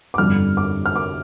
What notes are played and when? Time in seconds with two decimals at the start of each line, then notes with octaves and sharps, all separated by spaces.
0.14 D6
0.18 G1 F2 D3 G3 F6
0.57 D6
0.86 F6
0.96 D6